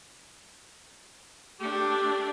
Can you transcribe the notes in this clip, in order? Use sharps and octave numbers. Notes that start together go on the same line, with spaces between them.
A3 D4 G4